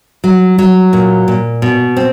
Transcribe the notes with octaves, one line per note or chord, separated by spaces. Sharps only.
F#3
F#3
A#2
A#2
B2
C4